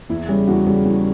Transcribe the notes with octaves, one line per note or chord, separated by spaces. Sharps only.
E2 E4
C#3 G3 C#4
E2 F#4
C#3 G3 C#4
E2